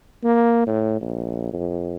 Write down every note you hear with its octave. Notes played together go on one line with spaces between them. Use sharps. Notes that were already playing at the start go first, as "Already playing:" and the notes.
A#3
A2
A#1
F2